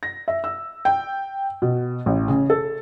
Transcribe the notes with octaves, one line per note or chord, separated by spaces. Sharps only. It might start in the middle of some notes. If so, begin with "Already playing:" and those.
A#6
E5
E6
G5
B2
A1
C#3
A4